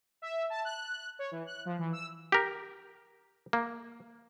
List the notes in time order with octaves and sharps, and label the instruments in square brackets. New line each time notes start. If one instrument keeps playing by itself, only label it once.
[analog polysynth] E5
A5
F#6
C#5
E3
F#6
F3
E3
E6
[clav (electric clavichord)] G4 A#4
A#3